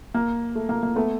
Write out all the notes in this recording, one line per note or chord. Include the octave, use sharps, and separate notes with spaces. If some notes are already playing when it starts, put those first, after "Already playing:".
A#3
A3
A#3
A#3
A3 B3